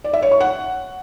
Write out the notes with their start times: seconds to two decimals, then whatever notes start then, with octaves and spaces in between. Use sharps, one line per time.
0.04 D5
0.13 E5
0.22 C#5
0.31 C#6
0.41 F#5